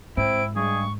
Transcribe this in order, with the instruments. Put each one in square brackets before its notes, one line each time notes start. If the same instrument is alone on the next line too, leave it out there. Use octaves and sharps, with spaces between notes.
[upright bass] G#2 [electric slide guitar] C4 [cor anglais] E4 [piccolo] D7
[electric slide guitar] G2 G#3 [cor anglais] G#4 [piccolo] C#6